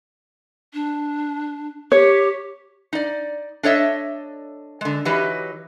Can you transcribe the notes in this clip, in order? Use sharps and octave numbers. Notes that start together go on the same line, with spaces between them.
D4
G4 C#5
D#4 D5
D4 A4 C#5 D#5 E5
D3 G#3
E3 F#3 D#4 G4 B4